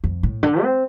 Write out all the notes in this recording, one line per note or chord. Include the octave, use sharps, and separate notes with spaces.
F2
A2
D3
C4